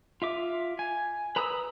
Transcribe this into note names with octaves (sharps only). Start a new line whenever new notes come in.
F4 E5 D6
G#5
B4 A#5 B5 D#6 E6